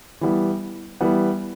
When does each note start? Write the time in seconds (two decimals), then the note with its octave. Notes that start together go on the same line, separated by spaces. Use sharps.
0.21 E3 G3 B3
1.01 E3 G3 B3